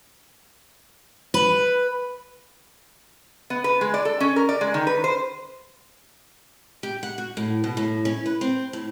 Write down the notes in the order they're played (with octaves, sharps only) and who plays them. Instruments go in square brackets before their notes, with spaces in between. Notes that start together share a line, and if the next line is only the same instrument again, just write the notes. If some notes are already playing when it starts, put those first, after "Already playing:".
[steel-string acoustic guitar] B4
[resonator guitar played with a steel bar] B3
B4
G#3
D5
A4
C#4
A#4
D5
G#3
D#3
B4
C5
[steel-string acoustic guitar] G4
F#5
F#4
A2
B2
A2
C#4
B4
C4
A2